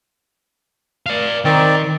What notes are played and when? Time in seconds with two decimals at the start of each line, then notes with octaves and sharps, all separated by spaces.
1.06 D5 F5
1.45 D#3 C4 D5